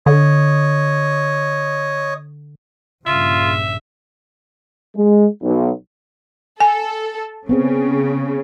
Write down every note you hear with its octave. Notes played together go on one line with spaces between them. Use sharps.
D3 C#5 D#5
A#1 G2 C#3 F4 E5
G#3
B1
A4 G#5
C#3 B3 C4 G#4